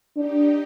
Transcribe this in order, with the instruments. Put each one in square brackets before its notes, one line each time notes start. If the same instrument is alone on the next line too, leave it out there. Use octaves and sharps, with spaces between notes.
[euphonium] D4 [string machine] D#4 G4